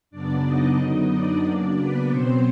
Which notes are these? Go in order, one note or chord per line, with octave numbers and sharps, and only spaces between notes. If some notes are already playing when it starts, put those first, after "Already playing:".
F#2 C#3 F#3 B3 D4 D5
D#4 D#5
F#2 D3 F#3 B3
D4 D5
C#3 F#3 A#3
B3 B4
B2 F#3 B3 C4 C5